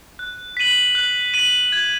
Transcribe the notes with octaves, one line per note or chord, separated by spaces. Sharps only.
F#6
B6 D#7 F#7
F#6
B6 D#7 F#7
G#6